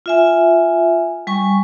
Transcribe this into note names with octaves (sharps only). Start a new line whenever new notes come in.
F4 E5 G#5
G3 G#5 C#6